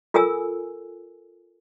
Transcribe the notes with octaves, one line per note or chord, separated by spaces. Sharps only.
F4 A4 A#4 G#5 E6